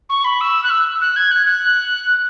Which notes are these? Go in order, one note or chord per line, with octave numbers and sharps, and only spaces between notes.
C#6
B5
E6
F#6
E6
F#6
G#6
F#6
F#6